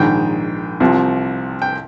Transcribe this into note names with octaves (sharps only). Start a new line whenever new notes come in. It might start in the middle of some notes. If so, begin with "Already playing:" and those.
Already playing: A#1 G#2 D#3 G5
C2 C3 F3
G5